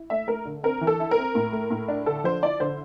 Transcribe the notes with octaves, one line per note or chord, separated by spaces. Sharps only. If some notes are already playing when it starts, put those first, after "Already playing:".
Already playing: E4
A3 E5
A3 A#4
D3
C4 A#4
E3
A4
E4
A#4
C4
A2
A3
A2
D4
D3 A4
F3 C5
E4 D5
D3 C5